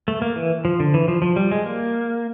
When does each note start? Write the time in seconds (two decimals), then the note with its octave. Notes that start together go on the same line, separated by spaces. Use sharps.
0.08 A3
0.22 A#3
0.36 E3
0.65 F3
0.80 D3
0.94 E3
1.08 F3
1.22 F3
1.36 G3
1.52 G#3
1.66 A#3